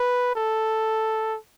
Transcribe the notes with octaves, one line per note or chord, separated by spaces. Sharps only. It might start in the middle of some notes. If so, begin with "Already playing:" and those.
Already playing: B4
A4